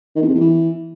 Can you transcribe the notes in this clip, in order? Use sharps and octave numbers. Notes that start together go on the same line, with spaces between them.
D#3
E2
C3
E2
E3